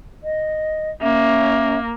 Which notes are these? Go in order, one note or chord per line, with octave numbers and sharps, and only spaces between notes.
D#5
A#3 C#4 E5